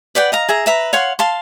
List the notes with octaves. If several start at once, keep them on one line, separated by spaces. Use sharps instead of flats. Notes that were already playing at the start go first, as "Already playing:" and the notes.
B4 D5 F#5 G5
D#5 F5 A#5
G#4 E5 A#5
B4 E5 A#5
C#5 F5 F#5 C6
F5 A5 C6